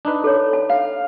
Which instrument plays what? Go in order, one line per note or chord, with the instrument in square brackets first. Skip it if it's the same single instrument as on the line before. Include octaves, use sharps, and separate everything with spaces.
[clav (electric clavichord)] D4 D#4 B4
[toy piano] A4 C#5
A5
[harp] F5